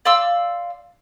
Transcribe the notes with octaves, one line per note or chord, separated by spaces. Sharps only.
D5 F5 C6 E6